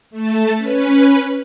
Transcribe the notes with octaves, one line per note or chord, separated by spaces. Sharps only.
A3 A5
C#4 B4